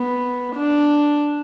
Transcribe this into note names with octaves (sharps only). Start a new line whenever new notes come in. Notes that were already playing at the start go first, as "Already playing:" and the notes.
Already playing: B3
D4